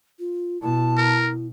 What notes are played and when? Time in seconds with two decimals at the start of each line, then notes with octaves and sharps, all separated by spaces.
0.19 F4
0.62 B2 E4 A5
0.97 A#4